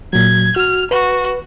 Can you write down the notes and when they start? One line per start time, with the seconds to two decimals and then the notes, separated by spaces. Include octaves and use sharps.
0.13 A#2 F#3 G#6
0.56 F#4 F6
0.91 F#4 B4